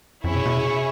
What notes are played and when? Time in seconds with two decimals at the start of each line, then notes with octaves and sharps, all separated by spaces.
0.24 F2 C#4 E4 G#4 C#5 E5
0.35 B2
0.46 B2
0.56 C3